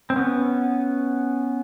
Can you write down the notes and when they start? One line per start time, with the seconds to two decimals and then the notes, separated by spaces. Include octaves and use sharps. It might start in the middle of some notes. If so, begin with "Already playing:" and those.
0.10 C4
0.16 B3 C#4